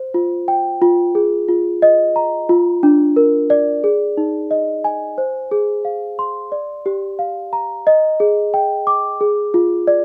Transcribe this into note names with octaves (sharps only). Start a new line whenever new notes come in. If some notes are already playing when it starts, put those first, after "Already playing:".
Already playing: C5
F4
G5
F4
G#4
F4
D#5
A#5
F4
D4
A#4
D5
G#4
D#4
D#5
G#5
C5
G#4
F5
C6
D5
G4
F5
A#5
D#5
G#4
G5
D6
G#4
F4
D5